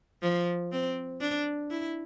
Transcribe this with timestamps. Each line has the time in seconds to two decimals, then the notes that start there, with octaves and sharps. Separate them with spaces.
0.23 F3
0.72 C4
1.21 D4
1.70 E4